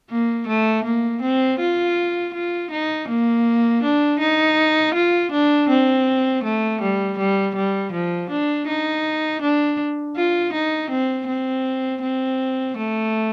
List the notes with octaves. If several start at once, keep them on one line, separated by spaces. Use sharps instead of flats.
A#3
A3
A#3
C4
F4
F4
D#4
A#3
D4
D#4
F4
D4
C4
A3
G3
G3
G3
F3
D4
D#4
D4
F4
D#4
C4
C4
C4
A3